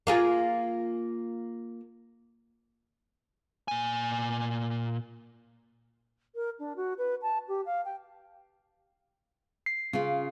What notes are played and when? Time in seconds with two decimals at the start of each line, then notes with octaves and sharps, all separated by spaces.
0.07 A#3 F4 G#4
3.68 A#2 G#5
6.35 A#4
6.59 D4
6.76 F#4
6.98 B4
7.22 A5
7.48 G4
7.65 F5
7.85 G5
9.66 C7
9.93 C#3 F4